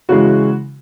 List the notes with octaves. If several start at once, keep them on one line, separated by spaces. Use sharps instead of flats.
C#3 E3 G#3 F#4